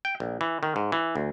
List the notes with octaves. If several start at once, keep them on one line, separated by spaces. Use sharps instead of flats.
G5
A#1
E3
D#3
G#2
E3
D2